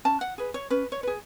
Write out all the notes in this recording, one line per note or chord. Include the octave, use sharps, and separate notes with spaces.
C#4 A5
F#5
G#4 B4
C#5
C#4 B4
C#5
B4
G#4